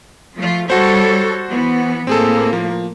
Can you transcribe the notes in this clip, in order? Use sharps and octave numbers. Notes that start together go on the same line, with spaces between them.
F3 A3 F4
G3 F#4 A4 C5 C#5
E3 B3
A2 A#3 C4 G#4 A4
F3